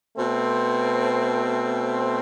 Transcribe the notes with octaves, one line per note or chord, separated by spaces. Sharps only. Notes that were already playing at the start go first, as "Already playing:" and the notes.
B2 A3 C4